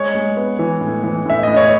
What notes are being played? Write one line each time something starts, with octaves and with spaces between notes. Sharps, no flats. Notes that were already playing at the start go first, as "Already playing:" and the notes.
Already playing: G#3 C#5
G#3
B3
E3
A2
E3
A2 E5
A2 D#5
C#5